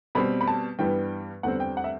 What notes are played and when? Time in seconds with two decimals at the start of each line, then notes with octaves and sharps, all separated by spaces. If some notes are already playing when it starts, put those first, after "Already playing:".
0.15 B2 G3 C4 B5
0.41 B5
0.47 A5
0.79 G2 E3 G3 B3 G5
1.43 E2 D3 G3 C4 F#5
1.60 G5
1.77 F#5
1.84 E5